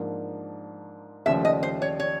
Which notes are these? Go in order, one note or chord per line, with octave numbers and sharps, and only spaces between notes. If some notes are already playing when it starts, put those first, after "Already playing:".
Already playing: G#2 F3 A#3 D4
D#2 C#3 F3 A3 E5
D#5
C5
C#5
C#5